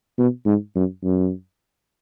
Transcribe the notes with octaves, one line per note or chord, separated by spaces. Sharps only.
B2
G#2
F#2
F#2